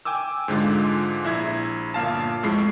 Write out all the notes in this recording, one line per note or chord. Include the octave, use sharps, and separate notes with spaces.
G5 G#5 D6 E6
G#2 D3 G#3 F4
A#1 E4 E5 G#6
G1 A#2 F5 A5
F2 A2 G#3 C7